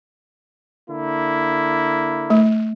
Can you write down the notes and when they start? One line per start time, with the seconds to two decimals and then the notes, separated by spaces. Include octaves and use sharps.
0.89 D3 A#3 E4
2.30 A3